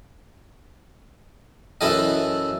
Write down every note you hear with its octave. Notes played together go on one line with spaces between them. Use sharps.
F#2 E3 E4 A4 D#5